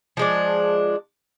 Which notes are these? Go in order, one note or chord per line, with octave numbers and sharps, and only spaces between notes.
F3 G#3 D4